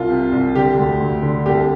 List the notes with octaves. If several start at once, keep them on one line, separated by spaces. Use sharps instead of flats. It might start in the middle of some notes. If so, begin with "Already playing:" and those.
Already playing: C2 F4
C3
C2
D3 G4
D2
D2
D3
C2 G4